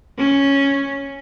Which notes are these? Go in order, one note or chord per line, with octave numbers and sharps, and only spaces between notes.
C#4